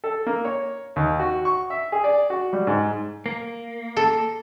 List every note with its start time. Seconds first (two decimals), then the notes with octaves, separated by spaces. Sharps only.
0.04 A4
0.26 A#3
0.45 C#5
0.96 D#2
1.20 F#4
1.45 C#6
1.70 E5
1.92 G#4
2.04 D5
2.30 F#4
2.53 G3
2.67 G#2
3.26 A#3
3.97 A4